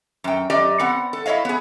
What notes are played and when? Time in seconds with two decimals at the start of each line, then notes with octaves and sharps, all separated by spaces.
0.24 F#2 G5
0.50 F#2 G4 D5 D#5
0.79 B3 C4 F#5
1.13 A4
1.26 E4 F#4 C#5 D#5 F5
1.45 B3 G#4